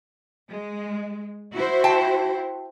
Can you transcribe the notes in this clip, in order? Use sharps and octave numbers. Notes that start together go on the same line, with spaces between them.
G#3
E4 F#4 C5
G5 A5